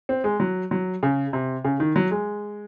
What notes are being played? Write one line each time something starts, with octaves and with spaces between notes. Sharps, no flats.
C4
G#3
F#3
F#3
C#3
C3
C#3
D#3
F#3
G#3